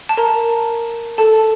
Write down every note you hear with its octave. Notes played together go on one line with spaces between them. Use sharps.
A5
A#4 A#5
A4 A5